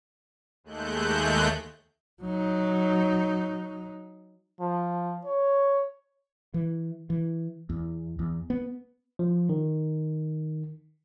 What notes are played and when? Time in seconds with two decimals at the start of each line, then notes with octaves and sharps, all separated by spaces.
0.64 D#2 G#3 A3 F#6 G6
2.22 F#3 D#4
4.60 F3
5.25 C#5
6.54 E3
7.10 E3
7.69 E2
8.19 E2
8.50 B3
9.19 F3
9.49 D#3